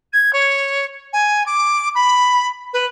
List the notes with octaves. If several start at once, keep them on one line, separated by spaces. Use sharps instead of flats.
G#6
C#5
G#5
D6
B5
B4